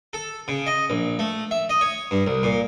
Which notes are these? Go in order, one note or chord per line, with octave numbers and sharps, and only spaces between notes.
A4
C#3
D#5
A#1
A3
E5
D#5
C#5
G2
C2
A#2